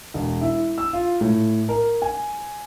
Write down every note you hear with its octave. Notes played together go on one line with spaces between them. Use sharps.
E1
E4
E6
F4
A2
A#4
G#5